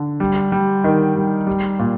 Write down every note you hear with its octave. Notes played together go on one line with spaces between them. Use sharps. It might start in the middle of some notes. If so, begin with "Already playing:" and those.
Already playing: D3
G3
G3
D#3
G3
G3
A#2